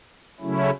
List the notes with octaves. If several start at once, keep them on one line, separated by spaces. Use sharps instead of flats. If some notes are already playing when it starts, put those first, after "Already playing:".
C#3 F#3 A3 C#4 E4